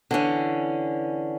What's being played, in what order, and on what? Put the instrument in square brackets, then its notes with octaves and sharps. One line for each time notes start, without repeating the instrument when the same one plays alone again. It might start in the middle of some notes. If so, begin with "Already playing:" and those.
[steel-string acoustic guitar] D3 E3 C#4